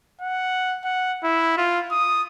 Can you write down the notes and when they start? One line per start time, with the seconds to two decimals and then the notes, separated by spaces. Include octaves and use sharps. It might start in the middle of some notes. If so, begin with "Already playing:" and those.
0.22 F#5
0.84 F#5
1.24 E4
1.58 F4
1.91 D#6